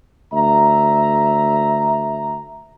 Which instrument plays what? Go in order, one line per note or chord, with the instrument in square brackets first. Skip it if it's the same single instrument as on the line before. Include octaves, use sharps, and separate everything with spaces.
[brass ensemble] D2 E5 A#5